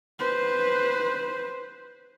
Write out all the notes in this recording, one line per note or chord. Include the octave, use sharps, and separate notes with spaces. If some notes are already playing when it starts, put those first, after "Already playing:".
B4 C5